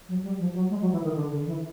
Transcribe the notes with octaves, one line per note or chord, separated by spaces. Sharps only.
F#3
G3
F3
F#3
G#3
F#3
E3
D#3
D3
D3
E3